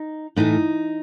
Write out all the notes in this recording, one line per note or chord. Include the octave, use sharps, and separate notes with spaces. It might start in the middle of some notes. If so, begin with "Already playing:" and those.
Already playing: D#4
A2 E3 A3 D#4